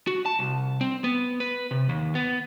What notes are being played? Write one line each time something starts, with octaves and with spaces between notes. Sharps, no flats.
F#4
A5
C2
C4
B3
B4
C3
D#2
B3